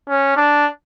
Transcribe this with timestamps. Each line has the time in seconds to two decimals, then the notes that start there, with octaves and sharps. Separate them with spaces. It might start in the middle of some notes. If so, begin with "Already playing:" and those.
0.08 C#4
0.36 D4